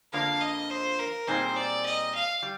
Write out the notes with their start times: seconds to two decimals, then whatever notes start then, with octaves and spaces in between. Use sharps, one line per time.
0.13 F2 D3 F3 A#3 D4 F5
0.41 D#5
0.70 C5
0.99 A#4
1.27 A#2 G3 C4 D#4 G#4 C5
1.56 D5
1.85 D#5
2.14 F5
2.42 G3